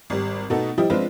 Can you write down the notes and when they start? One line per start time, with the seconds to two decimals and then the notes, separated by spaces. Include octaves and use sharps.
0.10 G#1 G3
0.50 B2 A3 B3 D#4 A4
0.78 F3 G3 E4 G4 D#5
0.90 F3 G#3 C4 D4 F4 B4